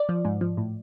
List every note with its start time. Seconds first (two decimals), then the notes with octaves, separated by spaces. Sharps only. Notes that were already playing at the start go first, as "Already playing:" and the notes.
Already playing: D5
0.09 F3
0.25 G#2
0.41 F3
0.57 A2